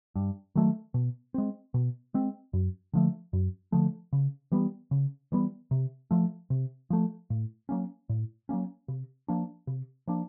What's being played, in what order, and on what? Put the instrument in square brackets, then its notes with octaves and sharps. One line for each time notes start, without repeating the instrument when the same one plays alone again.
[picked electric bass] G2
D#3 F#3 A3
B2
G#3 C4
B2
G#3 C4
F#2
D3 F3 A3
F#2
D3 F3 A3
C#3
E3 G3 B3
C#3
E3 G3 B3
C3
F3 A3
C3
F3 A3
A2
F#3 A#3 C#4
A2
F#3 A#3 C#4
C3
F3 A#3 D4
C3
F3 A#3 D4